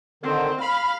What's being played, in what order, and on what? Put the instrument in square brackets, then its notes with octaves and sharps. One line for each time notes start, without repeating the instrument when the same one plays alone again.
[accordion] D3 D#3 [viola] C4
[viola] F5 [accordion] B5